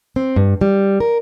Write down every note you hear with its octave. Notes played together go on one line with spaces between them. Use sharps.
C4
G2
G3
A#4